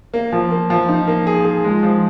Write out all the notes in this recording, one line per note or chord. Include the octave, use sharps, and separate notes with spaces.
A#3
F3
A#3
F3
D#4
A#3
G#4
G#4
G#3
F3